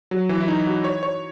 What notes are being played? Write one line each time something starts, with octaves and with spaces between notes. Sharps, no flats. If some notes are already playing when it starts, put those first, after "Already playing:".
F#3
E3
E4
D#4
F#4
C#5
C#5